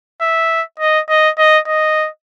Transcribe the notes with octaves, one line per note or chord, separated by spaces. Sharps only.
E5
D#5
D#5
D#5
D#5